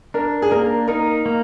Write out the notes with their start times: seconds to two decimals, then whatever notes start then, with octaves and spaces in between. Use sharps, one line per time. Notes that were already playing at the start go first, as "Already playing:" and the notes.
0.14 D4 A#4
0.42 G#4
0.51 A#3 A#4
0.88 D#4 A#4
1.26 A#3